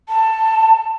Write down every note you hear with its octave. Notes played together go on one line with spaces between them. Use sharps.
A5